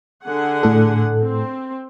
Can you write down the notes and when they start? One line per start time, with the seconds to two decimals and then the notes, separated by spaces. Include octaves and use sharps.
0.24 D3 G#4 F#5
0.63 A2 A4
1.20 C4